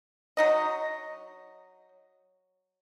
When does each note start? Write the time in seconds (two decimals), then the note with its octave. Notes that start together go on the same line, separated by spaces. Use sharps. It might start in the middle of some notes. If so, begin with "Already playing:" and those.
0.37 F#3 D#4 D#5